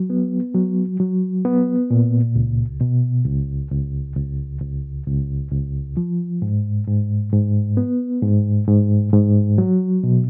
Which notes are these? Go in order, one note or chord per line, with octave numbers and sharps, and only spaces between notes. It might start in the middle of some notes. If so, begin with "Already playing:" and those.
Already playing: F#3
B3
F#3
F#3
B3
A#2
C#2
B2
C#2
C#2
C#2
C#2
C#2
C#2
F3
G#2
G#2
G#2
B3
G#2
G#2
G#2
F#3
B2